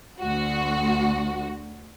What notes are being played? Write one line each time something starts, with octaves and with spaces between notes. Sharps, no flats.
D2 F#4